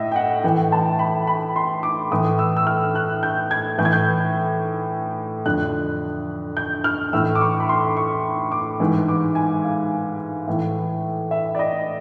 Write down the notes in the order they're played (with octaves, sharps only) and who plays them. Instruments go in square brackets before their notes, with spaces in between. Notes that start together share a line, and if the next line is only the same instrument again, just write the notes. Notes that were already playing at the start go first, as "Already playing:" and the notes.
Already playing: [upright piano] A2 D#5 E5
G5
F#5
A2 E3 G5
A5
B5
B5
C6
D6
A2 E3 D#6
E6
E6
F6
F#6
G6
G#6
A2 E3 G6
G#6
G6
F2 D3 F#6
G6
F6
A2 E3 E6
D6
C#6
B5
C6
C#6
D6
G#2 E3
D6
G#5
F5
A2 E3
E5
D5
D#5